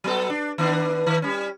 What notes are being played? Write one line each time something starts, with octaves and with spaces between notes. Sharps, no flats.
F#3 B3 A4
D4
D#3 B3 D4
D#3
G3 C#4